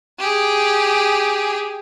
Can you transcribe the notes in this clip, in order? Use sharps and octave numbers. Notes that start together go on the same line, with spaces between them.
G4 G#4